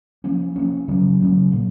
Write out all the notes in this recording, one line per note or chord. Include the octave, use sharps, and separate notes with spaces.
F3 A#3 C#4
F3 A#3 C#4
C#3 F#3 C#4
C#3 F#3 C#4
A#2 F#3 A#3